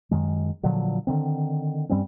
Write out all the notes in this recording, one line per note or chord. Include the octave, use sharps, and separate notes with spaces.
F#2 D#3 G#3
A#2 D3 F3 F#3
D3 D#3 C4
G2 G3 C4 C#4